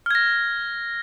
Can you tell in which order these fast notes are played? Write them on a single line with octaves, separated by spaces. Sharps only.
F6 G#6 A#6